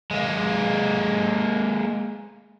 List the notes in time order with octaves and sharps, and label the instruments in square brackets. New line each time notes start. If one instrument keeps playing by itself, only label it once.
[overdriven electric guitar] G#3 A#3